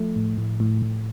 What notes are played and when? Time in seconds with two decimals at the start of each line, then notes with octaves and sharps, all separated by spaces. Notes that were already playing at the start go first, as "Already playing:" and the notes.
Already playing: F3 A3
0.16 A2
0.38 A2
0.60 A2
0.82 A2